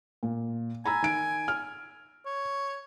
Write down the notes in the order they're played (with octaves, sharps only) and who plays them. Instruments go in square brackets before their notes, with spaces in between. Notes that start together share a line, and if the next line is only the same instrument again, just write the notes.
[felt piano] A#2
[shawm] G#5 [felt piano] A#5 B5 E6
[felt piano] D#3 D7
F6
[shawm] C#5